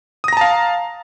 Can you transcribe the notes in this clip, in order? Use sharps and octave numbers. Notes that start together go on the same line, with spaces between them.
F5 A5 A#5 D#6 A#6